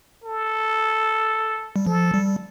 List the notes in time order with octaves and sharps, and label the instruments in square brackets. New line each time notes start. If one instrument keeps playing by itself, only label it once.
[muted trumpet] A4
[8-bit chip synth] G3
[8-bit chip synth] F3 [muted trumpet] A4
[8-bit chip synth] G3